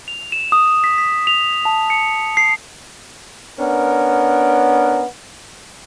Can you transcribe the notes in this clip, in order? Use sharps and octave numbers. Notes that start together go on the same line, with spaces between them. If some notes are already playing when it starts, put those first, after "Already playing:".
F7
E7
D#6
B6
B6
F7
A5
C#7
C7
B3 C#4 D4 A#4